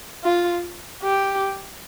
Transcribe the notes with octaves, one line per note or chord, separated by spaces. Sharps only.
F4
G4